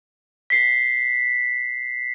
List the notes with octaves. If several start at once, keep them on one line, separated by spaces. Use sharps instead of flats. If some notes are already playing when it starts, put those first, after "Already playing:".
B6 C7